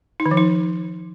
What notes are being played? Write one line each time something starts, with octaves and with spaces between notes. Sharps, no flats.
D#4
D#3
F3
D#4